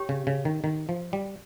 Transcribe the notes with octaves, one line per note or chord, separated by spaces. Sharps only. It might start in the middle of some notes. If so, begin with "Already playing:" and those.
Already playing: G4 C#5 G5 C#6
C#3
C#3
D#3
D#3
F3
G3